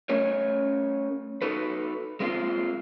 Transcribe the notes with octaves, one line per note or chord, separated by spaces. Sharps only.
A3 C#4 A#4 C#5
D#4 F#4 A4 B4
G#3 A#3 C4 E4 F4